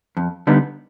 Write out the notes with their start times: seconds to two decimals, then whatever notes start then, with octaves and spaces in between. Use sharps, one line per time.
0.17 F2
0.47 D3 G3 B3 D#4